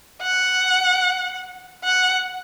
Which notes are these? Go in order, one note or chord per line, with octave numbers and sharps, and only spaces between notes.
F#5
F#5